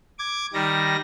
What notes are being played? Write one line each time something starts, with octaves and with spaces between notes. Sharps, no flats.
D6 G#6
D#3 G3 A#6